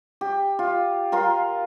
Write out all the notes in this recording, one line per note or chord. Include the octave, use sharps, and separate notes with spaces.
G4
F4
F4 A#4 C6